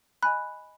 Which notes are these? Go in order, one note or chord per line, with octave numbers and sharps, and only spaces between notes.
D#5 G#5 B5 F#6